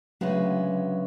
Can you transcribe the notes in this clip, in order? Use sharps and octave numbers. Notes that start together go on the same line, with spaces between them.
D2 C#3 F#3 G#3 B3